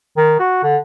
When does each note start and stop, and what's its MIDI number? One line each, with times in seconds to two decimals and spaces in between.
0.17 0.35 51
0.39 0.62 66
0.63 0.77 50